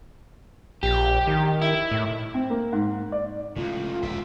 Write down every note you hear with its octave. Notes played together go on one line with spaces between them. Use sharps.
A#1 G4
D#3
E4
A2
C4
A#3
G#2
D5
C#2 A2 C#3 A3 F4
E1 C#2 A#2 C#3 E5